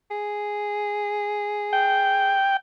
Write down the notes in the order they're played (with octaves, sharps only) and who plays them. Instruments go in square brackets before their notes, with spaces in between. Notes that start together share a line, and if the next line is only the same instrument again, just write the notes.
[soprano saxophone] G#4
[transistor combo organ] G5